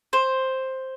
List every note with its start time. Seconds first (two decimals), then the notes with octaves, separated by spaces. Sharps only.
0.13 C5